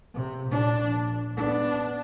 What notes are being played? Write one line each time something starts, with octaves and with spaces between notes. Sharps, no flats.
C3
A#2 D4
A#1
B3 D4